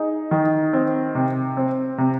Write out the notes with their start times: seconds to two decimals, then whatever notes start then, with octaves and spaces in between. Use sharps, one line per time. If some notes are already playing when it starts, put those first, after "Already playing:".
Already playing: D#4 G#4
0.31 D#3
0.73 C4
1.15 C3
1.57 C4
1.98 C3